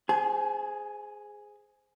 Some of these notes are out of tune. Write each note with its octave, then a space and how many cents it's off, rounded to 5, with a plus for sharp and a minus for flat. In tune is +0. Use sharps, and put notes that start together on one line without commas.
G#4 +0 C5 -10 G#5 +45